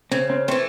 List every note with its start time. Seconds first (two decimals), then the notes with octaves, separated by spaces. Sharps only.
0.12 C#3 C4
0.30 C4
0.48 A3 C4
0.51 E3